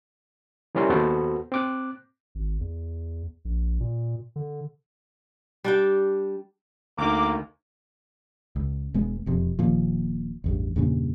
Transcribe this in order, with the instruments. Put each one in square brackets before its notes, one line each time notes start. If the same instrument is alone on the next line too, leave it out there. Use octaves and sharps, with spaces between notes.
[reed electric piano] E3 G3 C#4 A#4 C6
D#2 B3 F#4 A4 C5
C4 D6 F#6
[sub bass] G#1
E2
A#1
A#2
D3
[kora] G3 D4 G5
[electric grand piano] D2 D#4 [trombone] A#3 [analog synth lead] D6
[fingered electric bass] C#2
E1 G#3 B3
E1 F2 C3
D#1 D#2 A#2 F3
A1 E2 G2
E2 G2 A#2 C#3